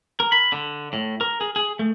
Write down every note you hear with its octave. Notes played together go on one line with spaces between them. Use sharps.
A#4
B5
D3
A2
A#4
G#4
G#4
A3